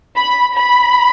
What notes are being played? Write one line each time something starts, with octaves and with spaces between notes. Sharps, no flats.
B5
B5